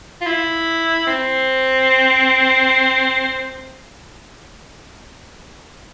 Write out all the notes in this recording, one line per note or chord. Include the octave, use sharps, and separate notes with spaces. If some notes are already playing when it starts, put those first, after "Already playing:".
F4
E4
C4